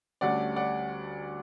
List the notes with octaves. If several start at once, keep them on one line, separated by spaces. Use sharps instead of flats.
D2 D3 G3 C#4 D5 F#5
D5 F#5